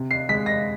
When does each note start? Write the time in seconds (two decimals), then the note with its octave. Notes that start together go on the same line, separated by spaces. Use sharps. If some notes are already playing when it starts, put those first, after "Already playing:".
Already playing: C3
0.11 C7
0.29 G#3 B6
0.46 A#6